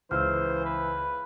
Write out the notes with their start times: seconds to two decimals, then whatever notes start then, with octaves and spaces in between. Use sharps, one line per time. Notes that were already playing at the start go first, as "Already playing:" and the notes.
0.11 C#2 E3 C5 E6 F6
0.65 B4